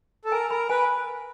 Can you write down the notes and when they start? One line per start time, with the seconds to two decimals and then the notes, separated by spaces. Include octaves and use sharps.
0.25 A4
0.32 A#4 G#5
0.50 A#4 B5
0.69 B4 G#5